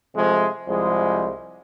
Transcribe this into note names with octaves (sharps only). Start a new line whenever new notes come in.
C3 F3 G#3 A3
C2 F3 G#3